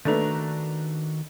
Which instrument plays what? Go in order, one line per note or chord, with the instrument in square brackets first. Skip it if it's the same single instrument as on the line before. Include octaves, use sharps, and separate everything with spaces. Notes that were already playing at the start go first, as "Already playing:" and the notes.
[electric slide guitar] D#3 F#4 A#5 [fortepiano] A3 D4 B4